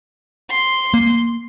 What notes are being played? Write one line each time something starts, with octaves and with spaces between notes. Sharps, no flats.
C6
A#3